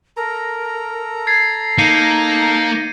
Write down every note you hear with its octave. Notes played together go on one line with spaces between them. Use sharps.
A4 A#4 A#5
G#6 A6 C7
A#3 D#4 G6 C#7 D#7